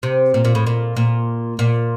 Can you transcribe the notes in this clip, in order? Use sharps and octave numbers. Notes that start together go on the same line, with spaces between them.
C3
A#2
A#2
A2
A#2
A#2
A#2